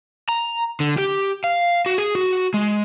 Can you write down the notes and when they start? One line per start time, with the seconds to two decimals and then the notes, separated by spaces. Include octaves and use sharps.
0.29 A#5
0.80 D3
0.98 G4
1.44 F5
1.86 F#4
1.98 G#4
2.15 F#4
2.54 G#3